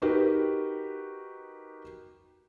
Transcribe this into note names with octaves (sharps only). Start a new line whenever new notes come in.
D#4 F#4 G4 A#4 B4